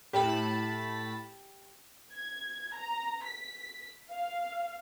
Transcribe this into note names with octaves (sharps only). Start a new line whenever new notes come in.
A2 G4 A5 B5
G#6
A#5
B6
F5